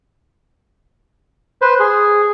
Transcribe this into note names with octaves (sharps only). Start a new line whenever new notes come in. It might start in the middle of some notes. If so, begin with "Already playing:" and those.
B4 C5
G#4